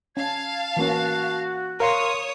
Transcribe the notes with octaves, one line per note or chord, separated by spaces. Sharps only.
C#4 F5 A5 G#6
E3 A#3 C#4 F#4
A#4 C#5 F5 C6 D#6